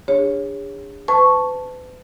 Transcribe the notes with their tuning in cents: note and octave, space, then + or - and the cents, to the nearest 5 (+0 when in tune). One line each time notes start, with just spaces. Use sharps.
D4 +0 G#4 -35 C#5 +0
B4 +40 A5 +0 C#6 +0